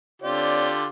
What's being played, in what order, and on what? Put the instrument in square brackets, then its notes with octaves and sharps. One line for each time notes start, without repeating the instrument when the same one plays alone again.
[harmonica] D3 F4 G4 [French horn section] C4 C#5 D5